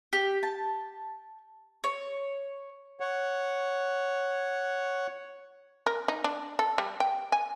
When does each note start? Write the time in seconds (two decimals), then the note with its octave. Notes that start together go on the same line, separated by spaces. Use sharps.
0.13 G4
0.43 A5
1.84 C#5
3.00 C#5 F#5
5.86 A#4
6.08 D#4
6.24 D4
6.59 A4
6.78 G3
7.00 G5
7.32 G#5